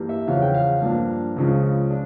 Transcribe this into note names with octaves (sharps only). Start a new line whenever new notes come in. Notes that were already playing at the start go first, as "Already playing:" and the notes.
Already playing: G2 E3 G3 A#3
E5
E2 C#3 F3 C#4 F5
G5
F5
G2 F3 A#3 D4
C#2 C#3 F3
D4